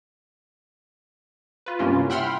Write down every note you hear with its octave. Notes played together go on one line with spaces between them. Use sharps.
F4 B4
G2 C3 A#3 C#4 E4 F4
E5 F#5 G5 B5 C6 F6